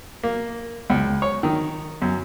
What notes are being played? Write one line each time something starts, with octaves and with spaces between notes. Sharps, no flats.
A#3
C#2
C#5
D#3
F#2